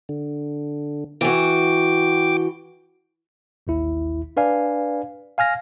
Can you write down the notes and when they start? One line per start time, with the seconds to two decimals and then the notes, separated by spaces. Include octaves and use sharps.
0.09 D3
1.21 E3 F#4 G5 D6
3.67 A1 D#2 E4
4.37 D4 B4 D5 F5 G#5
5.38 F5 G#5 F6 A#6